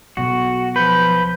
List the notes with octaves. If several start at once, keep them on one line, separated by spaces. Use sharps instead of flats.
B1 F#4
F3 B4 G6